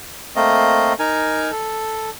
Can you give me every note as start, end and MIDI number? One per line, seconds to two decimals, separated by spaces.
0.36 0.93 57
0.36 0.93 58
0.36 0.93 60
0.36 0.93 75
0.99 1.51 63
0.99 1.51 70
0.99 1.51 80
1.51 2.10 69